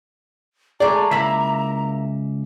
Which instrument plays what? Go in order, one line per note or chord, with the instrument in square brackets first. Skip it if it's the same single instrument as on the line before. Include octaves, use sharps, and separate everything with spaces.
[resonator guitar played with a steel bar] G#3 A3 G#4 [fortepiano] D5 [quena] A#5
[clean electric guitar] C#2 E5 B5 [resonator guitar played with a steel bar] A#3 E4